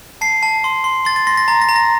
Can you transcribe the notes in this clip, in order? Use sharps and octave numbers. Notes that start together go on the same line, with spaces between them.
A5 C7
A5
C6
C6
C6 A6
A6
C6 A#6
A#6
A#5 A6
A#6
A#5
A#6